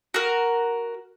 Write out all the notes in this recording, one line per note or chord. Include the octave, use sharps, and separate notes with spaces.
F#4 A#4